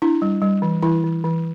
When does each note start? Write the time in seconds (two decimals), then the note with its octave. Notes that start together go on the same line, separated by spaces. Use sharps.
0.02 D4 E4
0.22 G3
0.42 G3
0.62 E3
0.83 E3 E4
1.04 E3
1.24 E3